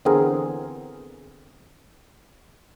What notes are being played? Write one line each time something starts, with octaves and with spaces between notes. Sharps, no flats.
D3 E3 B3 C4 G#4 A#4